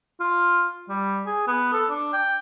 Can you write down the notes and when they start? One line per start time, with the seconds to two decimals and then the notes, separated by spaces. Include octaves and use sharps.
0.20 F4
0.89 G3
1.26 G#4
1.48 B3
1.73 A4
1.90 D4
2.13 G5